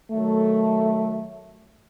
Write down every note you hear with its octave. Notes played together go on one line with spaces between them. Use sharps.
D#3 F#3 A3